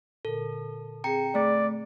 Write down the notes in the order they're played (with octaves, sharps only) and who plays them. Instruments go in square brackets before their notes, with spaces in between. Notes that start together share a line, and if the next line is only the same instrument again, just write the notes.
[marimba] A#2 D3 A#4 [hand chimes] A4
[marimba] C4 G#4 [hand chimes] G5 A#5 C#7
[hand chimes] A3 [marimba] G#4 [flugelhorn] D5